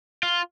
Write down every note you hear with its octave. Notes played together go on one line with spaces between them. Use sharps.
F4